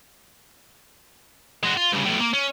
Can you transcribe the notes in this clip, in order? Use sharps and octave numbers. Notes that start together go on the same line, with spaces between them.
G#3 F#4
F4
G2 C#3
B1 A2
A#3
C#4